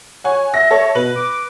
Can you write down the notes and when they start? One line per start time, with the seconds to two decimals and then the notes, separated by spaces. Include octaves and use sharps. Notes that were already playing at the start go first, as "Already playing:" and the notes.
0.24 C#5 F#5 G#5
0.54 E5 A#6
0.71 A4 C#5
0.95 B2 B4 F#7
1.16 D6